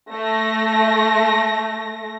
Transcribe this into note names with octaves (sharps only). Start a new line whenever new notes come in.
A3 A#6